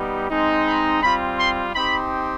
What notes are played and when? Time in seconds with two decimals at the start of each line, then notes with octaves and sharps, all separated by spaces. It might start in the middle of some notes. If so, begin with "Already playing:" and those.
Already playing: G3 B3 D#4 G4
0.30 G#3 C4 D#4
0.66 B5
1.02 G3 C4 F4 B5
1.38 C6
1.74 C4 D#4 G4 B5